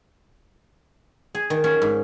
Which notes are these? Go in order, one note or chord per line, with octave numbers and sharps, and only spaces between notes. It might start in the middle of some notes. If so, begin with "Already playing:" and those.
G#4
D#3
C#4
G#2